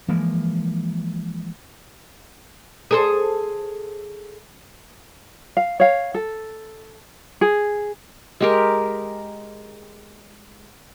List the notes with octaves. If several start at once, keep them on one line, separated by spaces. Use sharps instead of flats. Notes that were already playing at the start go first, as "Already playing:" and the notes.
E3 F3 G#3 A#3
G#4 A4 C5
F5
C#5 F5
A4
G#4
G#3 G4 A#4